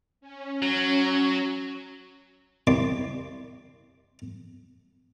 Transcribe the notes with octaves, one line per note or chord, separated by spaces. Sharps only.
C#4
F#3
C2 D5 C6